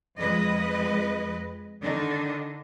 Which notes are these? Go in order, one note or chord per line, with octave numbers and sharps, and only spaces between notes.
F2 G#3 B4 D#5
D3 D#3 D4 D#4